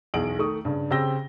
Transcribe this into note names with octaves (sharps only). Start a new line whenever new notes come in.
B1 E2 G#4 D7 F#7
D#3 A3 C#6 D#6
G2 C#3
C#3 C4 G4 E6 A#6 G7